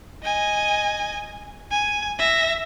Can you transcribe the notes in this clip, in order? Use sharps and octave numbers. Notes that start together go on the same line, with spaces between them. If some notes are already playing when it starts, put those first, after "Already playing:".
D#5 G#5
G#5
E5 A#6